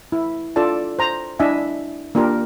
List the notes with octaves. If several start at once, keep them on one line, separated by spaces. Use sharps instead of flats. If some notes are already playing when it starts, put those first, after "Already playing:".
E4
D4 F4 A4 D5 A5
C5 A#5
D4 E4 D#5 E5 G#5
A#3 D4 F4 G4 A#4